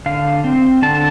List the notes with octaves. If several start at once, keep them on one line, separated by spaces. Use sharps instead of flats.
D3 F5
C4
D3 A5